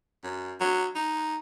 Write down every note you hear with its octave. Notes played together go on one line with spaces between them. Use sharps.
F#2
F#3
D#4